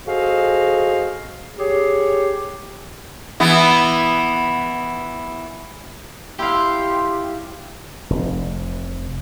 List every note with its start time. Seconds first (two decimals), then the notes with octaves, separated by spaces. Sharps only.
0.06 F#4 G#4 A4 C5 D#5 F5
1.59 G4 G#4 C#5
3.40 E3 B3
6.39 E4 G4 F5 C6
8.10 F1